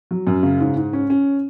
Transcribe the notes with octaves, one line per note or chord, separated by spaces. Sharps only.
F#3
F#2
C#3
G#2
G#2
C#4
C#4